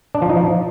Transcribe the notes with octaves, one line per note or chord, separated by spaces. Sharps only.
D4
F3
D#4
F3